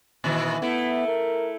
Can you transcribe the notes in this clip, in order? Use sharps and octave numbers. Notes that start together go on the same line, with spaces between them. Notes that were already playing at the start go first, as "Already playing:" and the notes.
A#2 D#3 E3
A3 B3 E4
A#4